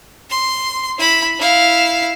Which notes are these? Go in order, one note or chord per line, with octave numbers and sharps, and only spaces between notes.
C6
E4 B5
E4 F5